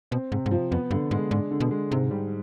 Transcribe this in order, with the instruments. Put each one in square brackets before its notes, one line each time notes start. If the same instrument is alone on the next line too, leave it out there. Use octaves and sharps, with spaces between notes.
[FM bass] B2 [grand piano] C4
[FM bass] G#2 [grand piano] C3
[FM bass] G#2
[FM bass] G2 [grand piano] F3
[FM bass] F2 [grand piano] B3
[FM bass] G2 [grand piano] D3
[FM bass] G#2 [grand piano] G#3
[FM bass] G#2 [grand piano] D4
[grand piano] D3
[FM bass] B2
[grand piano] G#3
[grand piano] G#2 [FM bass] C3
[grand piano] G3